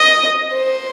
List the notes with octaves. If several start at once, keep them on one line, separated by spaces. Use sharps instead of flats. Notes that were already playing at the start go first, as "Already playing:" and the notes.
Already playing: D#5
C5